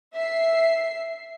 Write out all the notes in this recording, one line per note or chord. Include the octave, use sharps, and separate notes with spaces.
E5 C7